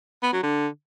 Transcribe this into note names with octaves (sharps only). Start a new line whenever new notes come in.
B3
F#3
D3